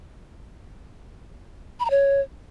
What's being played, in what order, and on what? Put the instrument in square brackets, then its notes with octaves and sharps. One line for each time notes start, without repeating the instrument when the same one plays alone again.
[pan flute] B5
A#5
C#5